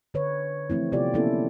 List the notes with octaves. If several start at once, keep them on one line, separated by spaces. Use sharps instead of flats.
D3 B4 C#5
E3 F3 A3 C4 E4
C3 B3 F4 G4 D5
A#3 B3 C#4 E4 A4